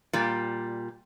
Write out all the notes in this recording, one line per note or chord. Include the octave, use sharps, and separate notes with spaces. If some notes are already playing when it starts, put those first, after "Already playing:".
A#2 G3